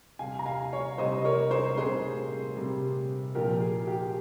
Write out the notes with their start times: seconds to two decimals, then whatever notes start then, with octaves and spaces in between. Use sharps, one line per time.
0.19 C3 G3 F5 G#5
0.39 A#5
0.46 F5 G#5
0.72 C#5 F5
0.98 C3 G3 C5 D#5
1.24 A#4 C#5
1.51 G#4 C5
1.77 C3 G3 G#4 C5
2.56 C3 G3
3.35 A#2 F3 G4 A#4
3.61 G#4
3.87 G4